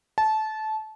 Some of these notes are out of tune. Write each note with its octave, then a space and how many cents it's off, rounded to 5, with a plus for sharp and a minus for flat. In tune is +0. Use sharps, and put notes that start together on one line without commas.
A5 -20